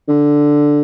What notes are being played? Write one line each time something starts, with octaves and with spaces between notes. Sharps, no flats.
D3